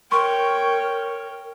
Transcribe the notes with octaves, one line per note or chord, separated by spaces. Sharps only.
A#4 C#5 G5 C6 C#6